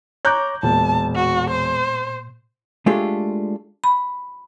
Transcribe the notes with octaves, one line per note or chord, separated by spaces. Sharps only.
C#5 A#5 D6 F#6 G6
E1 A#2 A5
F#4
C5
G#3 A3 D4 F4 G4 A4
B5